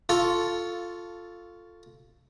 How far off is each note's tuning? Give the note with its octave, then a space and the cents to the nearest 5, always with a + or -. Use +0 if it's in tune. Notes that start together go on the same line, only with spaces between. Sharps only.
F4 +0 A4 +0 C#6 +10